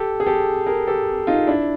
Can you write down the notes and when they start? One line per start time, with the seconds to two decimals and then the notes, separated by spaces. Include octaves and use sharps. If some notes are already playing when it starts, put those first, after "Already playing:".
Already playing: G4 A4
0.20 G#4
0.26 G4 A4
0.66 G#4 A#4
0.87 G4 A4
1.27 D#4 F4
1.47 D4 E4